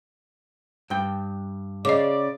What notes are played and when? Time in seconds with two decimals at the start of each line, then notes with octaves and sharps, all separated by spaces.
0.90 G2 G5
1.85 C#3 D5 D#5 D6